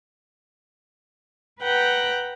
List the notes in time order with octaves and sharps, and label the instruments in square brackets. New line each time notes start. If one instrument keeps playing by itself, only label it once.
[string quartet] B4 F#5 G5 A#5